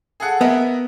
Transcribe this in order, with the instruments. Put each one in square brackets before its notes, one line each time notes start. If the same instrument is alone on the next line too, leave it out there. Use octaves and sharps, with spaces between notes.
[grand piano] G#4 A4 F#5
[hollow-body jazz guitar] B3 [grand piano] A#4 D#5 E5